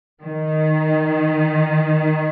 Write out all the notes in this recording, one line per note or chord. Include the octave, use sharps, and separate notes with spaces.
D#3